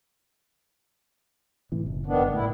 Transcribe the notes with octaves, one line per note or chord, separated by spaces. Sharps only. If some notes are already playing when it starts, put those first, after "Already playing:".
A2 C3 E3
F#1
D#3 B3 D4
G1
A2 A3 E4